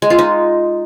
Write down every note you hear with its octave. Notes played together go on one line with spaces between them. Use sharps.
G#3
F4
D#4